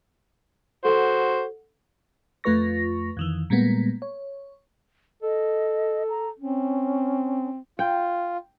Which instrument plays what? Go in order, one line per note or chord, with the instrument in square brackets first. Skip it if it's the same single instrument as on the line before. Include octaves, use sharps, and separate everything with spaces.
[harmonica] F#4 C5 [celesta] A4 F#5
[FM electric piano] F2 A3 F4 B4 C#6 A#6
F2 D#3 E3
A#2 G3 G#3 A#3 B3
C#5
[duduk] A4 [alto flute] D#5
[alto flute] A#5
[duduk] C4 [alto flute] C#4
[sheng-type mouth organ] F4 [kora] G5